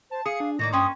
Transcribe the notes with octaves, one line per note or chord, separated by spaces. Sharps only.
C5 A5
G#4 F5 D#6 C#7
D4
A2 D#3 A#3 D5 A#6
G2 A#3 C#4 G5 C6 D#6